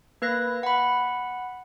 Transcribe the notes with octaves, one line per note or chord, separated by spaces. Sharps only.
A#3 B4 F#6 A#6
F#5 B5